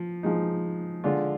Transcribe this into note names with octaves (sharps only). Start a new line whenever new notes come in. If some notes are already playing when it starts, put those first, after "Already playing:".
Already playing: F3
F3 G#3 D#4
D3 G#3 D4 F4